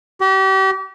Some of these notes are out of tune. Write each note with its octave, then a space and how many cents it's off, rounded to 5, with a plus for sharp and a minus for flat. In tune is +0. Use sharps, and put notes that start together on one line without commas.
G4 -35